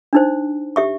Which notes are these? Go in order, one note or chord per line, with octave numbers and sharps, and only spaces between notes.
D4 D#4 C5
G4 E5 C#6